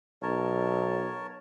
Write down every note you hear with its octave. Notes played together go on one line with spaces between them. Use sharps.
B1 A#4 C#5 A5